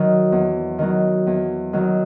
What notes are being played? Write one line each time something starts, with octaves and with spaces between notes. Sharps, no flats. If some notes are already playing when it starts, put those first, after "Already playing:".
Already playing: D#3 F#3
E2
D#3 F#3
E2
D#3 F#3